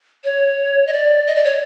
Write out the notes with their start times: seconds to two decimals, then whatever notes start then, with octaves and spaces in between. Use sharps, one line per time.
0.24 C#5
0.87 D#5
0.93 D5
1.27 D#5
1.36 D5
1.45 C#5